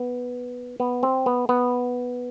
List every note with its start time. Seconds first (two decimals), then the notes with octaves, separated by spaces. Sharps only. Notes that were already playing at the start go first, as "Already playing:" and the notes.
Already playing: B3
0.80 B3
1.03 C4
1.26 B3
1.49 B3